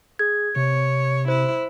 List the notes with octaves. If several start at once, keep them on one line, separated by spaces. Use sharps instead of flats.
G#4 G#6
C3 C#5
E4 C5